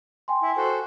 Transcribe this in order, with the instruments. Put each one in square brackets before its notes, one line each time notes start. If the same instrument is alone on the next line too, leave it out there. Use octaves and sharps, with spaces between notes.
[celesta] G5 G#5 C6
[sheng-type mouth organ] E4
F#4 A4 C5